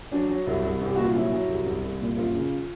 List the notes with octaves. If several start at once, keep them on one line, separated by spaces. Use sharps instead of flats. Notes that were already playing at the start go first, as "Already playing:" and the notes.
F#3 D4
F#3
C2 E4
C2
C2 G4
A#2 F#4
F4
F#3 E4
F#3
C2
C2
C2
A#2
F#2 F4
C#3